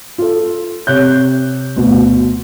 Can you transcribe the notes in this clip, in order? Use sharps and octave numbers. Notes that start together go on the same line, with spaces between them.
F4 A4
C3 C#5 F#6 G6
D2 B2